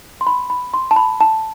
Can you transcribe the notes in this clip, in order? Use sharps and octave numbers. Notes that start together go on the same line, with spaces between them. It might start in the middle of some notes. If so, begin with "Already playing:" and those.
C6
B5
B5
C6
A5
B5
A5